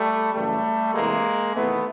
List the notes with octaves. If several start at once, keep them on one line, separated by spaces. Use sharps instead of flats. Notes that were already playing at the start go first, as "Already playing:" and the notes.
Already playing: G3 A3
F#2 C#3 E3 G3 A3
E2 C3 E3 G#3 A#3
E2 C3 D#3 A3 B3